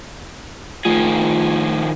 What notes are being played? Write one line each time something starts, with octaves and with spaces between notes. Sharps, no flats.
D#3 F3 A3 F4 G#4